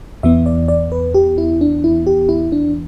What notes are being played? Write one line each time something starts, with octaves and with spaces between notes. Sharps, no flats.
E2 E3 B3 E5
D5
D5
B4
G4
E4
D4
E4
G4
E4
D4